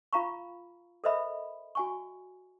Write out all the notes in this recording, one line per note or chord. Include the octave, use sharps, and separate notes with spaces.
F4 F5 A#5 B5 C#6
A4 A#4 C5 D#5 E5 B5
F#4 G#5 C#6